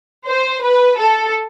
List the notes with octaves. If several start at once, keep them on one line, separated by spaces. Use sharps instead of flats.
C5
B4
A4